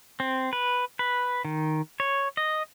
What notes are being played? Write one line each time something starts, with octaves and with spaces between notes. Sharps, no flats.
C4
B4
B4
D#3
C#5
D#5